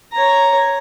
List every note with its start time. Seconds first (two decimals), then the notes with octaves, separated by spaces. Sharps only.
0.12 C#5 A#5